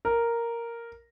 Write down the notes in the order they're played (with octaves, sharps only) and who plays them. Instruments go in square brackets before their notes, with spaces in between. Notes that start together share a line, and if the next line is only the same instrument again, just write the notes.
[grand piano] A#4